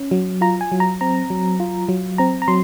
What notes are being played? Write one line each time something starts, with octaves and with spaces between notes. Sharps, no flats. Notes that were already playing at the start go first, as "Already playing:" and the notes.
Already playing: C#4
F#3
F4 A#5
G#5
F#3
A#5
C4 A#5
F#3
F4
F#3
C4 A#5
A#5
F#3 C6